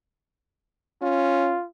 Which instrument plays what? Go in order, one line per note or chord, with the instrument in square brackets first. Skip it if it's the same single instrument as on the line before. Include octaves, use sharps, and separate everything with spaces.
[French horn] C#4 [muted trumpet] F4